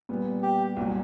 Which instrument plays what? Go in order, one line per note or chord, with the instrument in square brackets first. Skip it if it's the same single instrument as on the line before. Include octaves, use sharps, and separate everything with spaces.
[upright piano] A#2 G3 B3
[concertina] G4
[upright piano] C2 A#2 F#3